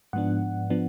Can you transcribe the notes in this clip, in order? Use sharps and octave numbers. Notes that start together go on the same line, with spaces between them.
G#2 F3 B3 D4 F#5
F3 B3 D4